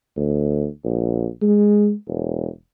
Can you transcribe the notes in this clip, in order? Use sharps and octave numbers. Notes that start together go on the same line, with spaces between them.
D2
A#1
G#3
E1